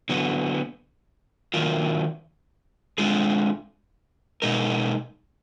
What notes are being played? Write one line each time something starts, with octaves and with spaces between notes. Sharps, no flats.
D3 F#3 B3
D#3 F#3 D4 F4 A#4
G#3 D4 F4 G#4
B2 G#3 D#4 A#4